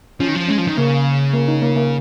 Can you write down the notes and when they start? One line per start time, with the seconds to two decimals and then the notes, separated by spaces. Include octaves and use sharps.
0.20 F3 C#4
0.28 D#3
0.35 F3
0.48 G#3 C#4
0.58 F3
0.68 D#3
0.77 C#3 A#3
1.34 A#3
1.48 D#4
1.62 A#3
1.76 A#3